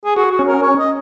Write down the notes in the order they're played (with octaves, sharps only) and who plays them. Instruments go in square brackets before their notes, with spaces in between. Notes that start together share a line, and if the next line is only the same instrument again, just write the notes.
[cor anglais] G#4
[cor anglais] F#4 [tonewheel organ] G#4
[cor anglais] F#4
[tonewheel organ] C#4
[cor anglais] A#4
C#5
D#5